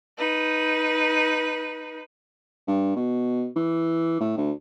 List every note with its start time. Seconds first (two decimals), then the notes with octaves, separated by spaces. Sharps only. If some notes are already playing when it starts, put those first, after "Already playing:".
0.18 D#4 B4
2.67 G2
2.96 B2
3.56 E3
4.20 A2
4.38 D2